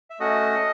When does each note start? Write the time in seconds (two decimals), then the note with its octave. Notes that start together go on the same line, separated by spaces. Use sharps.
0.10 E5
0.19 A3 C#4 F#4 D#5